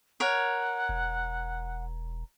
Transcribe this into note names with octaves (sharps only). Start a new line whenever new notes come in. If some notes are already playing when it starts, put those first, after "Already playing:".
A#4 C#5 F#5
E1